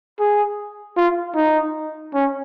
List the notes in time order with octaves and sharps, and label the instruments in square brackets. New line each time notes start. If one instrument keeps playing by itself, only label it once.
[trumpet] G#4
F4
D#4
C#4